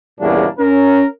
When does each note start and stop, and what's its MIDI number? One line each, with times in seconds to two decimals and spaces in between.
0.20 0.46 40
0.20 0.46 43
0.20 0.46 46
0.20 0.46 49
0.20 0.46 58
0.20 0.46 62
0.59 1.06 61
0.59 1.06 70